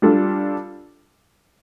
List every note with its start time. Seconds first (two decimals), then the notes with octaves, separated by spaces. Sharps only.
0.02 G3 D4 F4 A4